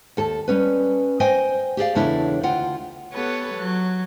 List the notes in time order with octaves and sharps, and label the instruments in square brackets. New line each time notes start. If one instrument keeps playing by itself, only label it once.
[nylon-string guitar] D#2 A4 A5
G3 C#4 B4
C5 D#5 G5 G#5
G4 G#4 D5 F5
E2 C#3 D4 E4 A4 C#5
D2 F4 F#5 G5
[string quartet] B3 G4 A4 B4 C#5 F#5
F#3 F#6